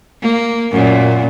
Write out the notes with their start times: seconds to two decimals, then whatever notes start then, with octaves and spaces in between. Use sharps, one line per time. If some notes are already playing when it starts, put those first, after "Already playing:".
0.22 A#3
0.72 F#2 A#2